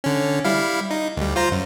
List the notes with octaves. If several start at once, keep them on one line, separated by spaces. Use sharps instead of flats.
D3 C#4
G3 E4 F5
D#4
D2 G3
F4 C5 A#5
F#2